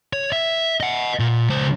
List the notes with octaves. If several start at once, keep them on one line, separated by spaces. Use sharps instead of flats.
C#5
E5
D#5 F#5
A#2
C#2 C5